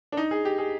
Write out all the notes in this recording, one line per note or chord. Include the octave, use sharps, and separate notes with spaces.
D4
D#4
G#4
G4
G#4